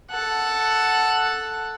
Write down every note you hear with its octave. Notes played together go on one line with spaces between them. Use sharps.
A4 F#5